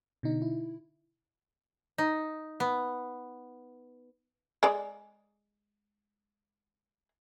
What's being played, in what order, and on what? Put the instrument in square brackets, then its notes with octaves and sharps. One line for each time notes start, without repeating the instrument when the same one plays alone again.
[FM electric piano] B2 D3 D#4
E4
[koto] D#4
B3
[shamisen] G#3 D5